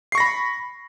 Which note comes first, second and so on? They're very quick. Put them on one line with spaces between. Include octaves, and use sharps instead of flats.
C7 C#6 A#6 B5